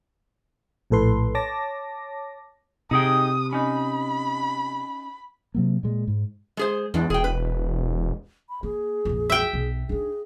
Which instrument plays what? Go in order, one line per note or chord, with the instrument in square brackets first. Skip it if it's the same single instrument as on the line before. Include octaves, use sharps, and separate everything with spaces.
[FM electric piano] A#1 A2 A4 B4 C6
C#5 A5 D6 A#6
[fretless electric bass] C3 [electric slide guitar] D#4 G#4 G5 [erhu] D#6
[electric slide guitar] C#4 D#4 [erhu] B5
[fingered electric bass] C3 F#3 A#3
A#2 G#3
G#2
[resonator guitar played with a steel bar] G#3 G#4 C5
[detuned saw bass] E2 [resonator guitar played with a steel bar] G#3 D4
[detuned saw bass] E1 [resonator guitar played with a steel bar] G#4 G5
[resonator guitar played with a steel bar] B4
[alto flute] B5
[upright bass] A#3 [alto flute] G#4
[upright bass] A#1 F2
[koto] E5 G5
[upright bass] B1
[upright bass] D4 D#4 [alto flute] G#4